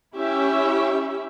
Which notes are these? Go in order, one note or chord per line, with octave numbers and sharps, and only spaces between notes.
C#4 E4 G4 E5